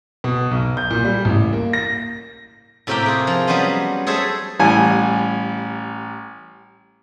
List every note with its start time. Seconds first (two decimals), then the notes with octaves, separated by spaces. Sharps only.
0.24 B2
0.51 B1
0.77 G6
0.90 A#2
1.04 G3
1.25 A1
1.53 A#3
1.73 A#6
2.87 A2 C3 A#3 G4 A#4 G5
3.06 F4 G#4
3.27 F3
3.47 F#3 G3 B3 C#4 C5 D#5
4.07 G#4 A4 C5 C#5 E5
4.60 A1 G3 G#5